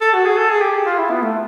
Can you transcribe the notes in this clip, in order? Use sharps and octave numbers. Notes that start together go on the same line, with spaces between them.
A4
F#4
G#4
A4
G#4
G4
F4
E4
B3
A3